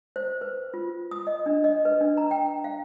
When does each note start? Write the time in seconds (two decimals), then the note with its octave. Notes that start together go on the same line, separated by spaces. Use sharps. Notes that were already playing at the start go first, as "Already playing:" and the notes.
0.16 C5
0.41 B4
0.74 F4
1.11 D#6
1.27 D#5
1.46 D4
1.64 D#5
1.85 B4
2.01 D4
2.18 A#5
2.31 G5
2.64 F5